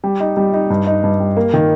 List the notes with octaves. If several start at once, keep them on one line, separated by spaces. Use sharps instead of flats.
G3
D#4
G3
D#4
G2
D#4
G2
G3
A#3
D#3